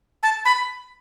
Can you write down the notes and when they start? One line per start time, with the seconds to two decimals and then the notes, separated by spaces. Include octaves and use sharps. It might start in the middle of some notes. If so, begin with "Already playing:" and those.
0.23 A5
0.45 B5